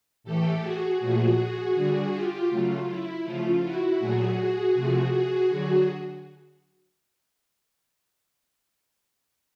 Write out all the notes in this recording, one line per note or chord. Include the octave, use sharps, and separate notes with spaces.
A2 E3 A3 G4 A4
F#4 G#4
A#2 F3 A3 F#4 G#4
D3 G3
F4 G4
C#3 F#3 A3 F4
E4
C#3 F3 A3 F4
E4 F#4
A#2 F#3 A3 F#4 G#4
C3 F3 A3
F#4 G#4
D3 F#3 F#4 G#4